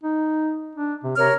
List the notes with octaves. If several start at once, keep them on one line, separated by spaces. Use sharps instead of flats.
D#4
D4
C3
C3 A#4 C#5 F6